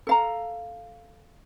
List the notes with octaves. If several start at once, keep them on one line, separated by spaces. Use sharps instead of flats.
A4 F5 A#5